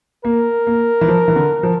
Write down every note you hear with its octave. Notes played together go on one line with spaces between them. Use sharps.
A#3 A#4
A#3
E3
F3
E3
D3
F3